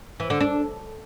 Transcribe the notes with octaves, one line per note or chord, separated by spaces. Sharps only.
E3
D3
D4